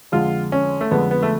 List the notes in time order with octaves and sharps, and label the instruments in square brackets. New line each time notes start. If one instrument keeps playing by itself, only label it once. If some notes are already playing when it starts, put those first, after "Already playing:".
[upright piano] F2 D3 G#3 [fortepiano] F4
[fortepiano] C#4
A3
[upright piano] F2 D3 G#3 [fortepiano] B3
[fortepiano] B3
A3